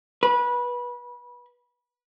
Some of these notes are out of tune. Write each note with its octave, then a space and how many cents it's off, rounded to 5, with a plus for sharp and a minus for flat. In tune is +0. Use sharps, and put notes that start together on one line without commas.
B4 -25